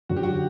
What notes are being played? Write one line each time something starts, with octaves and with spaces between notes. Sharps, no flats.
F#2 D3 F#3 F#4
G4
F#4